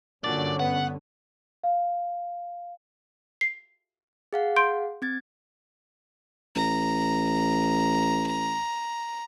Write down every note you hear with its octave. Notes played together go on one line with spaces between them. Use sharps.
G2 A#2 D3 F#3 C#4 D4 D5
B3 F#5
F5
C7
G#4 F5 F#5
C6 G6 D7
C4 G#6 A6
A1 A#5